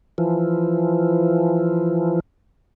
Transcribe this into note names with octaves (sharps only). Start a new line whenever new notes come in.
E3 F3